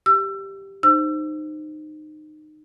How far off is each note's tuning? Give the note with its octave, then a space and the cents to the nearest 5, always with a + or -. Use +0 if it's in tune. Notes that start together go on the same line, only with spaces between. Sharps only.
G4 +0 E6 +30
D#4 -25 C5 +0 E6 +30